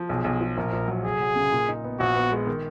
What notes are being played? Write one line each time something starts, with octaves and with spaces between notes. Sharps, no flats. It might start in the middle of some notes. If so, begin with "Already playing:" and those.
Already playing: F3
B1 G#4
B1
F3
A#1 A#4
A#1
F#3
F1 G#4
F#3
C#3
A#2
D#4
B3
A#1 F#4
B3
G#3
D#3